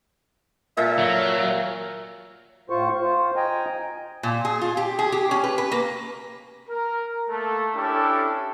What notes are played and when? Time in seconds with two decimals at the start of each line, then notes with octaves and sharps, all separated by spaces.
0.77 A#2 A4 E5 F5
0.99 F#3
2.70 A2 F4 C5 C#6
3.00 F4 C5
3.36 D#5 G5 G#5 A#5
4.23 A#2
4.45 G#4
4.61 F4
4.77 G4
4.99 G#4
5.12 G4
5.31 C#4
5.44 B4
5.58 B4
5.72 A#3
6.70 A#4
7.30 A3 A#3 A4
7.75 C#4 D4 E4 G4 A4